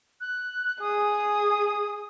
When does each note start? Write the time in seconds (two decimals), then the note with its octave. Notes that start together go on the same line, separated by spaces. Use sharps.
0.21 F#6
0.80 G#4 D#6